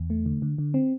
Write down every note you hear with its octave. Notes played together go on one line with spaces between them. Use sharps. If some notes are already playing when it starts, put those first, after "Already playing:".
Already playing: E2
A3
D3
D3
D3
C4